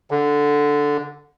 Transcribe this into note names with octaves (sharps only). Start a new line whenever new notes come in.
D3